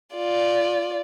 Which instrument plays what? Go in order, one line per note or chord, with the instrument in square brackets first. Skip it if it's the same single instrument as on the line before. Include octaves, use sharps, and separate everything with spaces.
[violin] F4 D5